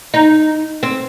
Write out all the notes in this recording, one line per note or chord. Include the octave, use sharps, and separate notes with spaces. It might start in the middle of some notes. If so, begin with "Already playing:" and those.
D#4
C4